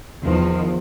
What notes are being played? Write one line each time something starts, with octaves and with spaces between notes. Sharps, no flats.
E2 D#3 F3